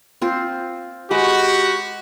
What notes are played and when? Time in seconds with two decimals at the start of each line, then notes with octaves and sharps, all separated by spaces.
0.22 C4 F4 C5
1.11 G#3 F#4 G4 B4 F#5